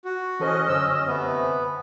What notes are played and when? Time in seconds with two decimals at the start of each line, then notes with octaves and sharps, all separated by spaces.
0.05 F#4
0.40 E3 C#4 A4 C5 D#5
0.68 F#2 D3 C5 E6
1.07 C3 E3 A3 B3